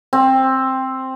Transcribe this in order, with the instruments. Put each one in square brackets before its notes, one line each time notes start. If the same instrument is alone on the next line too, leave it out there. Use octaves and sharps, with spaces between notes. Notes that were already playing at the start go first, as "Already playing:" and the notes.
[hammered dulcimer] C4